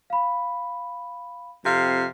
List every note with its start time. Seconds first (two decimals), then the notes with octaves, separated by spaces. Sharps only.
0.10 F5 B5
1.64 F2 C3 F5